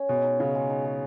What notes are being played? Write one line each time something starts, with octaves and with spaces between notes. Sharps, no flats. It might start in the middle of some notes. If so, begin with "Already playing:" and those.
Already playing: C#4 C#5
B2 G#3
D#4
C#3 G#3
G#3
D#4
G#3